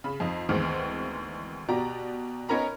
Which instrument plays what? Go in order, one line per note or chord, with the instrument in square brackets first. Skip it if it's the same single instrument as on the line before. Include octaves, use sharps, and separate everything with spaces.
[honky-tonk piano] C#3 B5
F2 D#4 D#5
D2 D#3 E3 G#3 B3 C4
B2 F#4 G4 D5 A#5
B3 C#4 D#4 A#4 A#5 B5